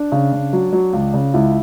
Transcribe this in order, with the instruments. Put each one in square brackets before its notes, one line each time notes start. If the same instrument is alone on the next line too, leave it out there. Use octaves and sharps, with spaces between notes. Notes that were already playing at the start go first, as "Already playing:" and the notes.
Already playing: [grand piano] D4
C#3
C#3
F#3
F#3
C#2
C#3
C#2 E4